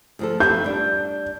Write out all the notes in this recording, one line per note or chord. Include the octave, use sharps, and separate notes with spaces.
D2 F3 A4
F2 B4 E5 G6
G3 D4